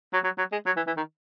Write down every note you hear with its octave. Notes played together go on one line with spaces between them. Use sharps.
F#3
F#3
F#3
G#3
F#3
E3
E3
D#3